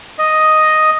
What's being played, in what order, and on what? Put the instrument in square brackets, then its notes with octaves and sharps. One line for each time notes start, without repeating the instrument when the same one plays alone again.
[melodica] D#5